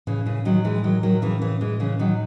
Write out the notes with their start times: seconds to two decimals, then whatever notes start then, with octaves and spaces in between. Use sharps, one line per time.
0.07 A2 C#3 E3
0.26 C#3 E3
0.45 D#3 F#3
0.65 E3 G#3
0.84 D#3 F#3
1.03 D#3 F#3
1.22 C#3 E3
1.41 C#3 E3
1.61 E3 G#3
1.80 C#3 E3
1.99 D#3 F#3